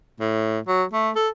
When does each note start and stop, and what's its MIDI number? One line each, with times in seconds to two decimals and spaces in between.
0.21 0.59 45
0.67 0.83 54
0.93 1.10 57
1.16 1.29 69